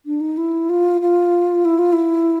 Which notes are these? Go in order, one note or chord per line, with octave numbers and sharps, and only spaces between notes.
D4
D#4
E4
F4
F4
E4
F4
E4